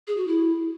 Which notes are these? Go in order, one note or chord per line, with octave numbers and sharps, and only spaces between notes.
G#4
F#4
E4